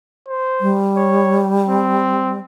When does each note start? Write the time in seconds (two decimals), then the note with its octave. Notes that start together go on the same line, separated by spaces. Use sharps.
0.29 C5
0.61 G3
0.97 C#5
1.69 C4